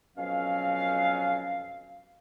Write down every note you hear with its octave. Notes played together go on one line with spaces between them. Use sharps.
F2 B2 F#3 C#4 F5